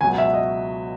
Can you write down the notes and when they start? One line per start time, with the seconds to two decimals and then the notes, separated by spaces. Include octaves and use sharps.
0.01 C#2 B2 F#3 G#5
0.18 E5
0.34 D#5